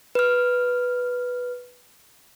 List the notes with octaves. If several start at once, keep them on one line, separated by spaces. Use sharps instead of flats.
B4 F6